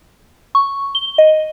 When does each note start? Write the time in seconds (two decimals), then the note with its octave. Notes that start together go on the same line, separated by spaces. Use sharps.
0.55 C#6
0.95 G7
1.18 D#5